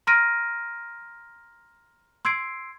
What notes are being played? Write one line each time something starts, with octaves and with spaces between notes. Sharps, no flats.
A#5 C6 F6 A#6 D7 D#7
C6 E6 G#6 C7 D7